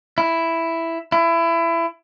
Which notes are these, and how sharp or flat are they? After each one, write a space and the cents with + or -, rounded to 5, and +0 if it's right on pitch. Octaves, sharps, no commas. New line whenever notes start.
E4 +5
E4 +25